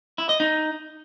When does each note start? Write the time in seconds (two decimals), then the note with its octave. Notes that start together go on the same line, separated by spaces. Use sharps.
0.18 E4
0.29 D#5
0.40 D#4